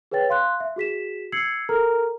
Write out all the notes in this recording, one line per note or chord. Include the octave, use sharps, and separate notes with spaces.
G#4 B4 C#5 G5 A6
F5 C6 F#6
E5
F#4 G#4 B6 E7
E6 G#6 C7 C#7 F#7
A4 A#4 A#5 F6